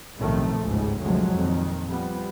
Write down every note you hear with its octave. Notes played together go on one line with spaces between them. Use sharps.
B1 A2 C3 D#3 F3 A3
G1 C#2 G#2 B2
D2 C3 F3 F#3 G#3
F2 A#2 D#3
F3 G3 B3